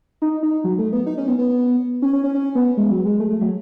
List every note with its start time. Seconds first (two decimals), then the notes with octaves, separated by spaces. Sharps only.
0.22 D#4
0.43 D#4
0.64 F#3
0.78 A3
0.93 B3
1.06 D#4
1.18 C#4
1.28 B3
1.39 B3
2.02 C#4
2.13 C#4
2.24 C#4
2.34 C#4
2.55 B3
2.77 G#3
2.91 F#3
3.05 G#3
3.20 A3
3.30 A3
3.41 F#3